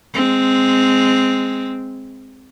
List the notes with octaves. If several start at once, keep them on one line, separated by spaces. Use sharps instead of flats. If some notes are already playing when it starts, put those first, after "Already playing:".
G#3 C4